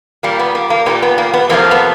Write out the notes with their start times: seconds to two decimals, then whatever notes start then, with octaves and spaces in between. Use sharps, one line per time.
0.23 A#2 G3 A#3
0.39 B3
0.55 A#3
0.70 A#3
0.86 A#2 G3 A#3 B3
1.02 B3
1.18 A#3
1.34 B3
1.49 F2 C3 F3 A3 A#3
1.71 B3